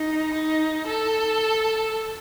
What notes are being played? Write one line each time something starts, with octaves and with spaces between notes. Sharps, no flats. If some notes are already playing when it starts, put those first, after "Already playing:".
Already playing: D#4
D#4
A4